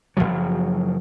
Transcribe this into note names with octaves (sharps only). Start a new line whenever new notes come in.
F#1 D2 F3 F#3